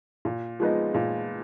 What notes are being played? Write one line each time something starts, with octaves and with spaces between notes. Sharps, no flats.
A#2
F3 G#3 B3 D#4
A#2